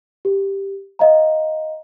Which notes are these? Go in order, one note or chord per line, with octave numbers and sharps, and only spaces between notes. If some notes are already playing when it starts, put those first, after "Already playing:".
G4
D#5 F5 A#5